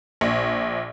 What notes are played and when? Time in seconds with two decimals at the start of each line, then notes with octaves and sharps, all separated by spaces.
0.21 A#1